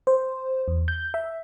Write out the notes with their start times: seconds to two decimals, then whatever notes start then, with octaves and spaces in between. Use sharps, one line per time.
0.07 C5
0.68 E2
0.88 G6
1.14 E5